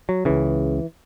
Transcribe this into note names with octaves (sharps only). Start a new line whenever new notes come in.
F#3
C#2 C#3 E3